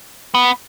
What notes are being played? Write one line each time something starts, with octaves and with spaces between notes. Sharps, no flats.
B3